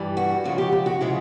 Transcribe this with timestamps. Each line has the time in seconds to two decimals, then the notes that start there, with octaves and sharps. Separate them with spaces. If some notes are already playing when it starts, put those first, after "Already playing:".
Already playing: G2 E3 G3
0.17 F#4
0.44 F#2 C#3 F3 G#3 F#4
0.58 G4
0.72 G4
0.86 F#4
1.01 C#3 F3 G#3 E4